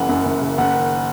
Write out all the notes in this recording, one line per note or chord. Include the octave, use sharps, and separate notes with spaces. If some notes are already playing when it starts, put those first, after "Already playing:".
Already playing: F#1 C#3 E3 F#5
F#2
F#1
C#3
F#1 F#5
D#3